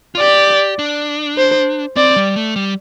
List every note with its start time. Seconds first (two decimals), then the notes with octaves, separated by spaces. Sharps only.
0.15 F4
0.19 G4 D5
0.79 D4
1.38 C5
1.96 C4 D5
2.16 G3
2.36 A3
2.56 G3